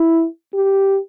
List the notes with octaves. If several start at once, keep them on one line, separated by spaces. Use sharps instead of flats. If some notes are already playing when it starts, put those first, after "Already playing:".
Already playing: E4
G4